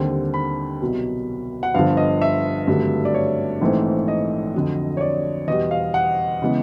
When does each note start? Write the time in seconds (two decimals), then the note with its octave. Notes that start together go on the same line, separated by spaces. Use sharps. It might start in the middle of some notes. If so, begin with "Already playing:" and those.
Already playing: D#2 D3 G3 C4
0.34 B5
0.82 C2 B2 F#3
1.63 F#5
1.74 G1 G2 D3 F3 F5
1.97 D#5
2.21 E5
2.67 G#1 G2 D3 F#3 A3
3.05 D5
3.14 C#5
3.61 A#1 G#2 E3 A3 C4
4.08 D#5
4.54 F2 D3 F#3
4.97 C#5
5.01 D5
5.48 E2 B2 G3 D#5
5.71 F5
5.94 F#5
6.42 C#3 E3 G#3 B3